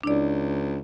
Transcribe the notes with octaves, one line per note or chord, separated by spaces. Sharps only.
C#2 D4 E4 D5